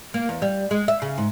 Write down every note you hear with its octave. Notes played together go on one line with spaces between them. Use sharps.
A#3
E2
G3
G#3
E5
C#3
G#2